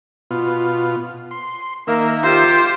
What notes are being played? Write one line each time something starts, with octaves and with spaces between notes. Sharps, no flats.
B2 F4
C6
D#3 A#3 A#4 E5
F4 G4 C5